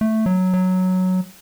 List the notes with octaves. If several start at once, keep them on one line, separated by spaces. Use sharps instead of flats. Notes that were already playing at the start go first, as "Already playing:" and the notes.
A3
F#3
F#3